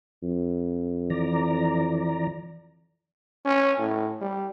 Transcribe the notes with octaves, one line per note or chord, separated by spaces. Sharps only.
F2
E3 D5 A#5
C#4
A2
G3